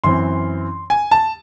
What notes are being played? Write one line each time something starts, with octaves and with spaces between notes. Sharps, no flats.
F#2 E3 C4 C6
G#5
A5